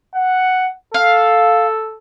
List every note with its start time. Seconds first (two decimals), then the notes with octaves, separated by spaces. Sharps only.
0.15 F#5
0.94 A4 F5